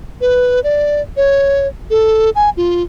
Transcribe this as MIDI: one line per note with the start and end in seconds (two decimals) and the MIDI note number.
0.21 0.60 71
0.64 1.02 74
1.17 1.67 73
1.90 2.30 69
2.35 2.50 80
2.57 2.83 65